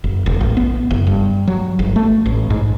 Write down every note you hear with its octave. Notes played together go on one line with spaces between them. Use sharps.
F#1
E1
A1
B3
F#1
G2
F#3
G1
A3
A1
G#2